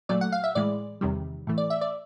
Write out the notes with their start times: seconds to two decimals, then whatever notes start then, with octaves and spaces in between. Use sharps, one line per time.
0.09 A#2 F#3 A3 D5
0.21 F#5
0.32 F5
0.44 E5
0.55 A2 E3 G#3 D5
1.01 E2 C3 D#3 G3
1.47 A2 E3 A3
1.58 D5
1.70 E5
1.81 D5